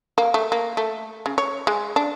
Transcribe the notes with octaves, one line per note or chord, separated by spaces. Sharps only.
A#3
A3
A#3
A3
C#3
C#5
G#3
D4